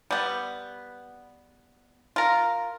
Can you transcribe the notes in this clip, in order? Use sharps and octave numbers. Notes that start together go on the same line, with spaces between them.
G3 B3
F4 A#4